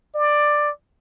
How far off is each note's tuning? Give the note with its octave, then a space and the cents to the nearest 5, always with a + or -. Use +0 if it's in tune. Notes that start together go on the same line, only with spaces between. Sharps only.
D5 +10